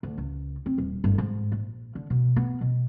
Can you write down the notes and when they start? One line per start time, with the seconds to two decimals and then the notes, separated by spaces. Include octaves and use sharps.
0.03 D2
0.18 C#2
0.66 C4
0.78 D#1
1.04 G1
1.18 G#2
1.52 A#1
1.95 D3
2.10 B2
2.36 B3
2.61 B2